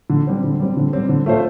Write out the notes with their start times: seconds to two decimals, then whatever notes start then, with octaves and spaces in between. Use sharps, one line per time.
0.10 D3
0.27 G3 C4
0.44 D3
0.60 G3 C4
0.77 D3
0.93 G3 C4
1.09 D3
1.26 A3 F4 C5